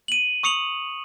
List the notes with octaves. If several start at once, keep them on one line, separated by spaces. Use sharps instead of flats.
D#7 F#7
C#6 D#6 C#7 F7 F#7